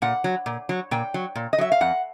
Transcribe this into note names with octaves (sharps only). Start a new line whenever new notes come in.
A#2 F#5
F#3
A#2
F#3
A#2 G5
F#3
A#2
D#5
F#3 E5
F5
F2 F#5